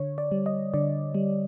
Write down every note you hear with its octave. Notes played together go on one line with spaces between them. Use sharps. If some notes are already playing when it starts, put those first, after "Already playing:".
Already playing: D3 C#5
D5
G3
D#5
D3 D5
G3